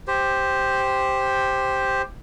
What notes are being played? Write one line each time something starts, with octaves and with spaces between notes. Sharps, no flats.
G4 C5